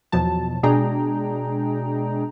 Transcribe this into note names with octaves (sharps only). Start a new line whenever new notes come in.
E2 B2 F3 F#3 A5
B2 G#3 D4 G#4 G5 A#5